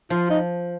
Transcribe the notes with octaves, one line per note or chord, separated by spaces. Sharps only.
F3 F4
D#4